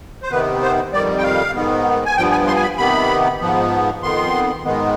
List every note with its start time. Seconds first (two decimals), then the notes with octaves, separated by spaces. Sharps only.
0.23 C5
0.30 C3 D#3 B3 B4
0.62 C5
0.93 F2 D#3 G3 D5
1.18 G5
1.23 F5
1.55 G#2 D#3 B3
2.06 G#5
2.17 G2 F3 B3 G5
2.32 G#5
2.48 C6
2.56 G#5
2.63 B5
2.78 C3 D#3 B3 B5
3.40 G#2 F3 B3
4.02 F2 D#3 B3 C6
4.64 G#2 D#3 G#3 B3